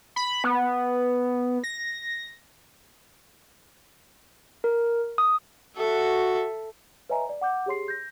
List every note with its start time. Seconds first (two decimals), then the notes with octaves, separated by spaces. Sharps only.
0.16 B5
0.44 B3
1.64 A#6
4.64 A#4
5.18 D#6
5.77 F#4 A4 E5
7.09 B4 C#5 D#5 E5 G#5 A#5
7.29 D5
7.41 F#5 D6 G6
7.66 G4 G#4 C#5 C6 C7
7.88 G6 A#6